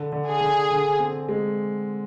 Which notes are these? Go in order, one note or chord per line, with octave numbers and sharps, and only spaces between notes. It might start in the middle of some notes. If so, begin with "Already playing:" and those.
Already playing: D3
D3
G#4
D3
D3
C4
G#3